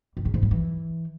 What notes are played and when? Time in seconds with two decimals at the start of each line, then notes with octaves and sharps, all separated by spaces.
0.17 G2
0.25 C#3
0.34 G#2
0.42 G3
0.51 E3